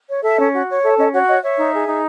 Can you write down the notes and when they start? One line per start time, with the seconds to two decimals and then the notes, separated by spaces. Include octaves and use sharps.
0.09 C#5
0.23 A4 E5
0.39 C#4
0.53 F#4
0.68 C#5
0.83 A4 E5
0.98 C#4 D#5
1.12 F#4 C#5
1.28 C#5 D#5
1.42 C#5 E5
1.57 D#4
1.72 G#4
1.87 D#4